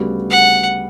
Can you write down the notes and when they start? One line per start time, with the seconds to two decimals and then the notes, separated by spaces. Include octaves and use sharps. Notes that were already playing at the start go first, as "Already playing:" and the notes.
Already playing: D2 C#3 G3 B3 F#4
0.30 F#5